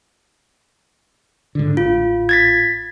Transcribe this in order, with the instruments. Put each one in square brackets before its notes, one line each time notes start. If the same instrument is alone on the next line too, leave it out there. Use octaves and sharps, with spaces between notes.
[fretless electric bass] G#2 D3
[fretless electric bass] A1 [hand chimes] F4
[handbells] G#6 A6 B6